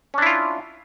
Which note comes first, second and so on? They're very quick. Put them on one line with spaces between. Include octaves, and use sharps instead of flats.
C#4 D4 E4 F4